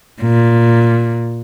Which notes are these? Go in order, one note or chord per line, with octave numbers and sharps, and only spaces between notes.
A#2